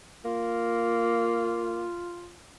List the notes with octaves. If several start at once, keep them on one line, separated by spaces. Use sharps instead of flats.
A#3 F4